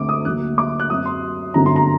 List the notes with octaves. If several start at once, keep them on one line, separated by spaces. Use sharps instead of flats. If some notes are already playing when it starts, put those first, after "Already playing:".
Already playing: D2 D3 A3 C4 D6
D#6
D2 D3 F#3 A#3 F#6
D6
F#6
F#2 F#3 C4 D#6
C6
G1 F#2 D3 F#3 C4 A#5
C6
A#5